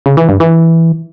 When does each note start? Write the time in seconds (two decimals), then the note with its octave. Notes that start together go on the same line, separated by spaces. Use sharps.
0.06 C#3
0.17 E3
0.29 G2
0.40 E3